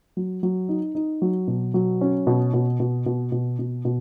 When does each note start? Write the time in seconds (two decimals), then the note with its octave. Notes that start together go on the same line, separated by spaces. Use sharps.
0.17 F#3
0.43 F#3
0.69 D#4
0.95 D#4
1.22 F#3
1.48 B2
1.74 F#3
2.01 C#4
2.27 B2
2.54 B2
2.80 B2
3.06 B2
3.32 B2
3.59 B2
3.85 B2